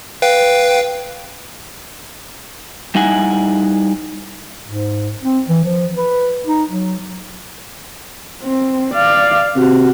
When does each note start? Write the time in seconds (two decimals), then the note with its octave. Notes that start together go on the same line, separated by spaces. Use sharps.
0.22 B4 F5 G5
2.95 G3 D#4 E4 F#5 G#5
4.66 G#2
5.22 C4
5.48 E3
5.64 F3
5.96 B4
6.47 D#4
6.70 F#3
8.43 C4
8.94 D5 F5
9.56 C3 F#4